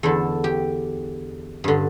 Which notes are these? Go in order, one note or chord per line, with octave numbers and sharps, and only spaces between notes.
E2 D3 A4
G4
G2 D3